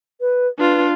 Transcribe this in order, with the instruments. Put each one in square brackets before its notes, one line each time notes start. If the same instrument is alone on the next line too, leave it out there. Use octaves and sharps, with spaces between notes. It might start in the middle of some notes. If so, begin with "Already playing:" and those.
[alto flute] B4
[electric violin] D4 F4 [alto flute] B4